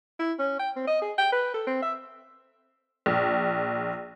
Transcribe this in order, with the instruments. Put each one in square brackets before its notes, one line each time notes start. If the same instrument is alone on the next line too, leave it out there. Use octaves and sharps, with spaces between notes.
[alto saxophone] E4
C#4
G5
C4
D#5
G#4
G5
B4
A4
C4
E5
[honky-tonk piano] A#1